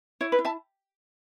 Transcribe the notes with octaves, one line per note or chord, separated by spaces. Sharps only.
E4 C#5
B4
E4
E5 A5